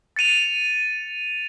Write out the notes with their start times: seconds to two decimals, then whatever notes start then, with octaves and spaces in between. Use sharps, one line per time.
0.16 A6 C#7 D#7 F7